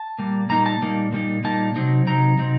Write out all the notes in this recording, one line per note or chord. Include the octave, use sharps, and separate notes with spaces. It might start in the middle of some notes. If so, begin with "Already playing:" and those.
Already playing: A5
A#2 G3 A#3
A#2 G3 A#3 D#4 A#5
A5
A#2 G3 A#3 D#4
A#2 G3 A#3 D#4
A#2 G3 A#3 D#4 A5
C3 F#3 C4 D#4
C3 F#3 C4 D#4 A#5
C3 F#3 C4 D#4